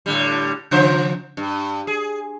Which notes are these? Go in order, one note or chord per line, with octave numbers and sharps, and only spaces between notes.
A2 D3 G3
C#3 F3 C5
G2
G#4